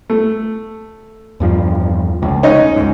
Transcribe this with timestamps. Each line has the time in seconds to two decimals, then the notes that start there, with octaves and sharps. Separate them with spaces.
0.10 A3
1.40 E2 G2 F3
2.22 F1 C#2
2.43 C#4 D#4 D#5
2.76 C#2 G#2